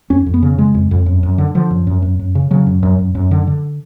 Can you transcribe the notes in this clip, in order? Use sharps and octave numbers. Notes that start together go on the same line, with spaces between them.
F2 C#4
F2
B3
C#3
C#3 G#3
F2
F2
F#2
F#2
D3
D3 F3
F#2
F#2
F#2
F#2
C#3
C#3 F#3
F#2
F#2
F#2
F#2
D3
D3